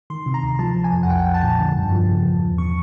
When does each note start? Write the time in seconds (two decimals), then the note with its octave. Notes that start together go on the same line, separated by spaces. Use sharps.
0.10 D#3 C6
0.26 C3
0.34 A#5
0.43 D2
0.59 F3 A5
0.76 F3
0.84 G#5
0.93 F2
1.03 F#5
1.09 B1 G5
1.26 F3
1.34 A5
1.42 A#2
1.59 D3
1.76 G2
1.92 F3
2.09 C#3
2.26 E2
2.42 E2
2.58 B2 C#6